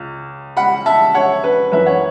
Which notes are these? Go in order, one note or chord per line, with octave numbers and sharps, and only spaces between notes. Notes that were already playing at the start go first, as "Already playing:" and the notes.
Already playing: C#2
F#5 B5
E5 A5
C#5 F#5
B4
F#2 E3 B4 E5
C#5 F#5